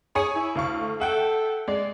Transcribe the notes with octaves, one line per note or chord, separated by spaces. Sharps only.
G#4 C#5 G#5 C#7
E4
D2 F5 C#6
A3
A4 E5 F#5 G5
G#3 D5